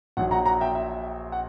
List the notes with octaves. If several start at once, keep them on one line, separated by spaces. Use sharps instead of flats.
A#1 A#2 F#3 F#5
F#5 A#5
F#5 A#5
E5 G5
E5
F#5